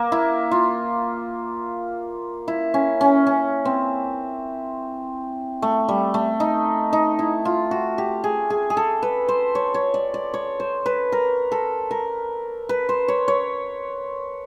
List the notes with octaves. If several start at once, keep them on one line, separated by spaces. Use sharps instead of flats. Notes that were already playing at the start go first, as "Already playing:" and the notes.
Already playing: A#3
E4
F4
E4
C#4
C#4
C#4
C4
A3
G3
A3
D#4
D#4
E4
F4
F#4
G4
G#4
G#4
G#4
A4
B4
C5
C#5
C#5
D5
D5
C#5
C5
B4
A#4
A4
A#4
B4
C5
C#5
C#5